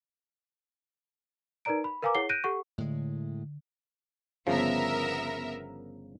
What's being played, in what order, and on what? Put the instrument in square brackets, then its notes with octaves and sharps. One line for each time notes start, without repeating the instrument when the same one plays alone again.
[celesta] D#4 A#4 B4 D5 A#5 D7
B5
A#4 B4 F5 G#5 A#5 D6
E4 G#4 C#5 F#5 C7 G7
F#6 G6 A#6 D7 D#7
G4 A4 F#5 C#6
[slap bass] A2 G#3 [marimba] D3
[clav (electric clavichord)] G1 C#3 F3 [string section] B3 A#4 E5